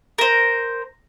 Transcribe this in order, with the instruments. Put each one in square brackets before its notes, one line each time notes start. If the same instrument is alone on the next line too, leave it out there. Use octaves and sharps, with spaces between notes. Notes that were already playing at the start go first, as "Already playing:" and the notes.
[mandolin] A#4 C5